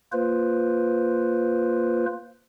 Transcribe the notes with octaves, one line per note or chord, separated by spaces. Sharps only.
A#3 F4 B4 C5